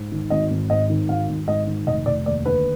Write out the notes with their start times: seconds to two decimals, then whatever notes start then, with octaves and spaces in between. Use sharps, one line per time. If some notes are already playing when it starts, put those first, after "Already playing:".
Already playing: G#2
0.12 D#3
0.30 G#1 D#5
0.50 G#1
0.70 G#2 D#5
0.90 D#3
1.09 G#1 F5
1.29 G#1
1.48 G#2 D#5
1.67 D#3
1.87 F1 D#5
2.06 F1 D5
2.26 D#2 D5
2.45 D3 B4